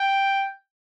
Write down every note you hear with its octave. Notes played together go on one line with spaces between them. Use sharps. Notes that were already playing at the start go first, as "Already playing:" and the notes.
Already playing: G5